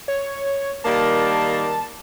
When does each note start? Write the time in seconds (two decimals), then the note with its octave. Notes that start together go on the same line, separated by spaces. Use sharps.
0.08 C#5
0.84 D#3 G3 A#3 A5